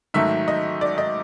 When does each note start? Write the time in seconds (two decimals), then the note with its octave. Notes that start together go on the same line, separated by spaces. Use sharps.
0.14 G#2 D#3 F#3 A3 E5
0.48 D#5
0.81 D5
0.98 D#5